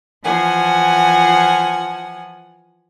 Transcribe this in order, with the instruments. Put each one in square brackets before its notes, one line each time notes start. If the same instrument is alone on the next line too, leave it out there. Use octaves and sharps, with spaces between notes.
[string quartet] E3 F3 F#5 G#5